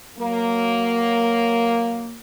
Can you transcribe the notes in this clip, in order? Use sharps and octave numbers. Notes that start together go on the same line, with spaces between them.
F#3 A#3